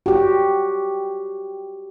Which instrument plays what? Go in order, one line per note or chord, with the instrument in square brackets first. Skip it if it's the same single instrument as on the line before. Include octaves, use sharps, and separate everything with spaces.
[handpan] F#4 G4